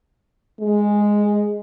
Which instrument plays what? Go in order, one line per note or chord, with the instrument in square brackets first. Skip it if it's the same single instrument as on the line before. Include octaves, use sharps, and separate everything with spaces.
[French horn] G#3